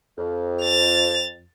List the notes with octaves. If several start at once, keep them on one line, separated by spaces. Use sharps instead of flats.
F2
A6 F7